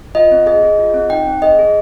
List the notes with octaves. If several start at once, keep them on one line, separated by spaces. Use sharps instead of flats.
F4 D#5
C4
G#4 D#5
G#4
F4
C4
D#4 G5
C4
G#4 D#5
G#4